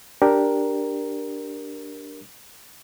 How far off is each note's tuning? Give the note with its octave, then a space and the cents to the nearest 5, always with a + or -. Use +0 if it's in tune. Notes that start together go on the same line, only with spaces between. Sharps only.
D4 +0 G4 +0 A#4 +5